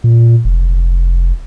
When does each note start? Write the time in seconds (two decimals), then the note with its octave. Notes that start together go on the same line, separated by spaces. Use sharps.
0.04 A#2
0.45 F1